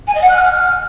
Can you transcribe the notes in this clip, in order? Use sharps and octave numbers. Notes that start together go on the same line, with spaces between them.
G#5
D#5
F#5
F#6
F6